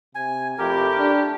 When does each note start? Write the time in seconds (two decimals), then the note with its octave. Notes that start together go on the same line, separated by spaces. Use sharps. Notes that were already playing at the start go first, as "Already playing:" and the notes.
0.15 C3 G#5
0.58 F2 A3 E4 G4 A#4
0.98 D4